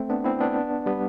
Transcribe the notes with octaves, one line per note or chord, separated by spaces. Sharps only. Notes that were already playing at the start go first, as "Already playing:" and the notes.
Already playing: A3 C4
B3 D4
C4 E4
B3 D4
G3 B3